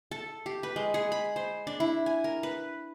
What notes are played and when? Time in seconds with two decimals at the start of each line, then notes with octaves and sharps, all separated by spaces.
0.11 A4
0.46 G4
0.63 B4
0.76 G#3
0.94 G#4
1.12 B5
1.36 C5
1.67 D4
1.80 E4
2.06 G#5
2.24 A#4
2.43 B4